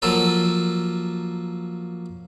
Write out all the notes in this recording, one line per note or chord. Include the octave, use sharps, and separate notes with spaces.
F3 F#3 A#3 A4 C5